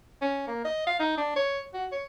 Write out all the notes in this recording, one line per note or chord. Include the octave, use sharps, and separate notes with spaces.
C#4
A#3
D#5
F5
D#4
D4
C#5
F#4
C#5